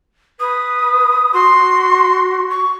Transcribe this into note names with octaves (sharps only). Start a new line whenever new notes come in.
B4 D#6
F#4 C6
C#6